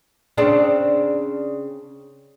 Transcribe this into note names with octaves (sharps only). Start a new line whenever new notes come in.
C#3 C4 D4